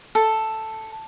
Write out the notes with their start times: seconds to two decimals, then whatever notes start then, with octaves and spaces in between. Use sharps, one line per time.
0.15 A4